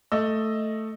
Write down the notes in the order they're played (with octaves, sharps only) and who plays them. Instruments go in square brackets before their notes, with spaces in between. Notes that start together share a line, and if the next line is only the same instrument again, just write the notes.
[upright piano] A3 D#5 E6